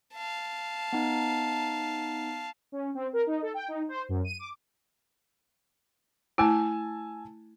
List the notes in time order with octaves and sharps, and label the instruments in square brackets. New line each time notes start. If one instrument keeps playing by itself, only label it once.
[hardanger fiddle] F5 A5
[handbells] B3 D#4
[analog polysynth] C#4
C4
A#4
D#4
A4
G5
D#4
C5
F#2
D#7
D6
[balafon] A3 E4 [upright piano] G#5 A5 E6